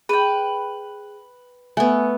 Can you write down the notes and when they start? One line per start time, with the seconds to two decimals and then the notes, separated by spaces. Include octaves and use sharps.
0.09 G#4 B4 G5 D#7
1.77 A3 B3 G#5